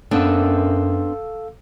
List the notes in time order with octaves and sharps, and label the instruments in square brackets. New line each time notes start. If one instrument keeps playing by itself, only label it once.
[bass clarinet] F#2 [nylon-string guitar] B3 C4 D4 [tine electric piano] A4 F5 E6